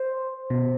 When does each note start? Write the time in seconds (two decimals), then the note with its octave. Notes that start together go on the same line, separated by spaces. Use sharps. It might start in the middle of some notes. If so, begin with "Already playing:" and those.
Already playing: C5
0.50 B2